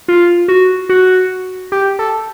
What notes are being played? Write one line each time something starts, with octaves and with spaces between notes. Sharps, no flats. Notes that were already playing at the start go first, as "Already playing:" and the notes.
F4
F#4
F#4
G4
A4